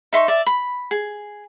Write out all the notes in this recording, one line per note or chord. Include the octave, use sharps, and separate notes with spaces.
D#4 E5 C6 C#6
D5 E5
B5
G#4